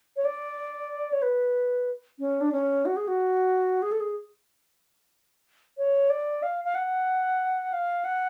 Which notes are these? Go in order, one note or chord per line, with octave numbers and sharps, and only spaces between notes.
C#5
D5
C#5
B4
C#4
D4
C#4
F#4
G#4
F#4
G#4
A4
G#4
C#5
D5
F5
F5
F#5
F5
F#5